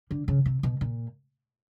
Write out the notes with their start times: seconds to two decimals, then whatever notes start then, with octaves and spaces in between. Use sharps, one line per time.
0.11 D3
0.28 C#3
0.46 C3
0.63 B2
0.81 A#2